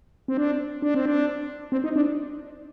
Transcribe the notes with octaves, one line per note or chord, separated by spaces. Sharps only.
C4
D4
D4
C4
D4
C4
D#4
D4